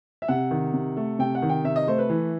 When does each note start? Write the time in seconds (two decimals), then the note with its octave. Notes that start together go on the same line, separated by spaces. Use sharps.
0.22 E5
0.28 C3 F#5
0.51 D#3
0.74 C3
0.97 A3
1.19 C3 G5
1.35 F#5
1.42 D#3
1.49 G5
1.64 C3 E5
1.76 D#5
1.87 A3 C5
1.98 B4
2.09 E3